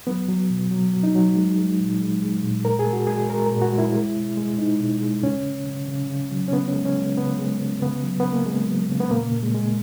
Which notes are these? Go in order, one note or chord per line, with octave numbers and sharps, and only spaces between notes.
F#3 B3
F#3
B2
F#3
F#3
D#4
F#3
G#3
G#3
A#2
G#3
G#3
A#2
A#2 A#4
G#4
G#3
F#4
G#3 G#4
G#3 A#4
A#4
A#2
F#4
G#3
E4
G#3
B2
G#3
G#3 D#4
B2
G#3
C#3 C#4
C#3
C#3
C#3
C#3
F#3
C#4
C#3 B3
C#4
G#3
C#4
G#3
C#3 B3
G#3
C#3
C#3 B3
F#3
B3
C#3
A#3
C#3 G#3
F#3
C#3
B3
A#2 A#3
A#2
G#3
G#3